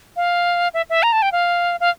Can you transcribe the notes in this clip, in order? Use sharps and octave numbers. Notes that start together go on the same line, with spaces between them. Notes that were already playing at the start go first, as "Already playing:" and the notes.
F5
E5
E5
A#5
A5
G5
F5
F5